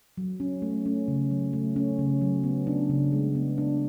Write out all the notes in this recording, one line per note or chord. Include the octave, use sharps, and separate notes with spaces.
F#3
C#4
A3
C#4
C#3
F#3
A3
C#4
C#3
F#3
B3
D4
C#3
G#3
B3
D4